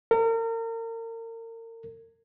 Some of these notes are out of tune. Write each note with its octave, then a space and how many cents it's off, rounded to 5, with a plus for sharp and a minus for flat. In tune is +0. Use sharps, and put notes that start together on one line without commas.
A#4 -35